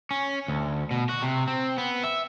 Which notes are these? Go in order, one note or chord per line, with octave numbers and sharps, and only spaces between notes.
C#4
D2
B2
F#4
C3
C4
B3
E5